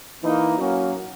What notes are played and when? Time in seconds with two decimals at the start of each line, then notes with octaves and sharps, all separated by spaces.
0.21 E3 A#3 D#4
0.57 F#3 A#3 C#4 F#4